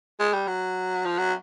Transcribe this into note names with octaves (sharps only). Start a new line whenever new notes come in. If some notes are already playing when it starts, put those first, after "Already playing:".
G#3
G3
F#3
F3
F#3